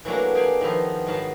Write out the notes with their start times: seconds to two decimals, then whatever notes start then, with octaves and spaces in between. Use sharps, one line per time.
0.05 E3 F#3 A3 A#3 D4 F#4
0.35 G4 G#4 D5 F5 G5 G#5
0.61 D#3 F3 B3 E4 F4
1.07 G#2 D#3 F#3 F5 A5 B5